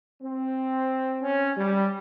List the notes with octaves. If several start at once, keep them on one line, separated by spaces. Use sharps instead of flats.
C4
C#4
G3